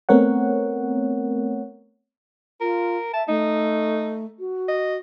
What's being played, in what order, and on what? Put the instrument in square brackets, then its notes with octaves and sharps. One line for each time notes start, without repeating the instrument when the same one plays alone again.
[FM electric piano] A3 B3 C4 A#4 C#5 F#5
[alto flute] F4 [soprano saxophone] A#4
[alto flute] E5 [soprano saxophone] A5
[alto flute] A3 [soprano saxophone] D#4
[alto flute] F#4
[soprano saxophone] D#5